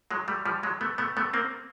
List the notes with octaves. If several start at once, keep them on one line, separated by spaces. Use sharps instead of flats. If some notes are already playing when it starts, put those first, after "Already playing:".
F#3 G#3
G3 A3
F3 G3
F#3 G#3
A3 B3
A3 B3
A3 B3
A#3 C4